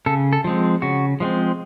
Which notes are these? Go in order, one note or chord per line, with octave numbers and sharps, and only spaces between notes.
C#3 A4
A4
F3 G#3 C4
C#3 F#4
F3 G#3 C4